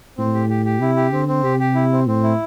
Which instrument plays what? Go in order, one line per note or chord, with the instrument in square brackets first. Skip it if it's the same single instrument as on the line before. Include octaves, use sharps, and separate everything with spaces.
[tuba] A2 [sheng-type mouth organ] C4
[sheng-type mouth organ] G4
G4
G4
[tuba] C3 [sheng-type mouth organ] E4
[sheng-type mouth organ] G4
[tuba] D3 [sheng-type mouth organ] C4
[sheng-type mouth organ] C4
[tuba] C3 [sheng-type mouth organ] G4
[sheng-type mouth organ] G4
E4
C4
[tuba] A2 [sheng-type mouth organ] C4
[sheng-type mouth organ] E4